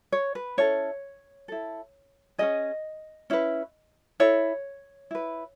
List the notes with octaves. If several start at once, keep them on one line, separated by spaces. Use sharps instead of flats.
C#5
B4
C#4 E4 A4 C#5
E4 A4
C#4 E4 G#4 D#5
C#4 E4 B4
E4 A4 C#5
E4 B4